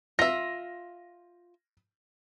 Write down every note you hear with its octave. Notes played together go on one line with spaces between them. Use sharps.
F4 E5 A#6